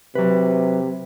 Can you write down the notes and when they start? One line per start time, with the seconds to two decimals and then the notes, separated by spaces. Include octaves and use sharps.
0.15 C3 F#3 B4